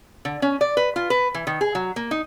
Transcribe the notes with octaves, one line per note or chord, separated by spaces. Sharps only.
D3
C#4
D5
B4
F4
B4
E3
D#3
G#4
F#3
A#3
D#4